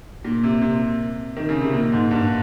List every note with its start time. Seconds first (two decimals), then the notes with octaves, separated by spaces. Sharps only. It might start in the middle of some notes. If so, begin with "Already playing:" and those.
0.25 A#2
0.43 C3
0.61 C3
1.37 D#3
1.49 C#3
1.61 C3
1.73 A#2
1.92 G#2
2.11 G2